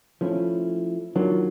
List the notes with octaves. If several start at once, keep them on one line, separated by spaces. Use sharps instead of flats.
F3 A3 C#4 E4
D#3 F#3 A#3 D4 F4